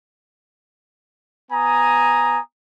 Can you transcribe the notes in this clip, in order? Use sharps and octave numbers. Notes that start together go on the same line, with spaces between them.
B3 G#5 A#5 D#6